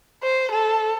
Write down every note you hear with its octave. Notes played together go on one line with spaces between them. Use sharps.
C5
A4